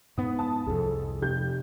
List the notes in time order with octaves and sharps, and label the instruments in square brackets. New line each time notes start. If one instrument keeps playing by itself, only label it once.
[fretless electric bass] G#2 B3 [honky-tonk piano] D#6
[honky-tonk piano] A5 D#6
[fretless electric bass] C2 F2 [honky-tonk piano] G#4 A4
[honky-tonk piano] F1 G4 G6